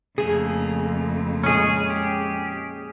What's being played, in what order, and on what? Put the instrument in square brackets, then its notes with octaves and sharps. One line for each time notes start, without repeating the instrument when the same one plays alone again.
[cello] F2 [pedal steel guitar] C#3 A3 A#3 [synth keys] G#4
[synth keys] A#2 G#3 [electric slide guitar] C#4 G#4
[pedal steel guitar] G4